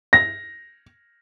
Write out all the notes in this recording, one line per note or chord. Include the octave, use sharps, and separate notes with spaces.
A#6